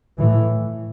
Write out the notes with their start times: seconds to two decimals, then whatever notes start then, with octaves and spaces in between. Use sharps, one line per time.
0.19 A2 E3